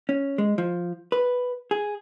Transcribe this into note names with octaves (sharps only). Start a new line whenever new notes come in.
C#4
G#3
F3
B4
G#4